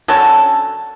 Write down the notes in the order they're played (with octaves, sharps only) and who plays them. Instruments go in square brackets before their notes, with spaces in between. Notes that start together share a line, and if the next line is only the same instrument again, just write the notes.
[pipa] D3 F#3 C#4 A4